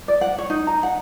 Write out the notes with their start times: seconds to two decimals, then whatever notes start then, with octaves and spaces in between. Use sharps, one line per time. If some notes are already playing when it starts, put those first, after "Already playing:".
0.08 D5
0.21 F#5
0.38 C#5
0.50 D#4
0.67 A#5
0.83 F#5